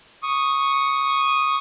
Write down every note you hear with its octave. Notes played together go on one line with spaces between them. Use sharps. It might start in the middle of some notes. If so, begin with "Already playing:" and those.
C#6 D#6